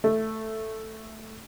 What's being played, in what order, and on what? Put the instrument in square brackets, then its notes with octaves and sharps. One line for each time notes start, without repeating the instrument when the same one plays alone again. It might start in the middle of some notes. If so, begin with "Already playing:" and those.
[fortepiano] A3